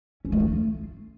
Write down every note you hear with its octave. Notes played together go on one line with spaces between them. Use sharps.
C#4
A3
F4